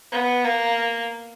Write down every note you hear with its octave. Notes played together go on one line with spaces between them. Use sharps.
B3
A#3